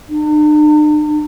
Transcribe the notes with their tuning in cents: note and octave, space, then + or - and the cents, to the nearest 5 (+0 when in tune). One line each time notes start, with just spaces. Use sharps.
D4 +45